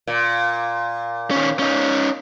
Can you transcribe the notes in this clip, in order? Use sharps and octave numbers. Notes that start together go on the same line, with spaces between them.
A#2
D#3 C#4
C#4 D#4